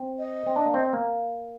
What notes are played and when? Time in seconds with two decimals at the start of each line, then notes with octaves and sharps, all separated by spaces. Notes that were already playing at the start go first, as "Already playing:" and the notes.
Already playing: C4
0.19 D#5
0.46 C4
0.56 D4
0.66 A#3
0.74 C4
0.93 A#3